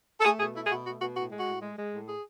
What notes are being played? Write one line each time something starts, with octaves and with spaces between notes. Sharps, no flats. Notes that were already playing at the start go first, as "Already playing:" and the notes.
A4
A3 G#4
B2 G#4
A3 E4
G#4
B2 F#4
A3 F#4
B2 F#4
A2 F#4
G#3
F#4
A2
G#3
G#3
A2
G#4